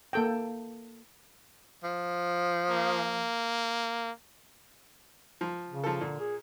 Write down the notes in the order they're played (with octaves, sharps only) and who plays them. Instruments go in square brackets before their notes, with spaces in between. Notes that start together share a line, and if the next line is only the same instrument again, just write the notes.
[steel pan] A#3 A4 G5
[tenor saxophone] F3
[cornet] A#3
[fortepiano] F3
[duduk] C#3
[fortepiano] F3 A4
[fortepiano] A#2 [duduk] D3
[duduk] G#4